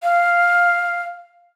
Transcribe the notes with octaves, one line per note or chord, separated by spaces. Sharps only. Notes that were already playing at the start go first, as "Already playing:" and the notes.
F5